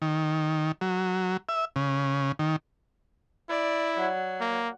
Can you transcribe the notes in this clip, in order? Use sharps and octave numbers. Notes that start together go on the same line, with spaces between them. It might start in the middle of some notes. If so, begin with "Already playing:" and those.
D#3
F#3
E5
C#3
D#3
E4 D5
F#3
A#3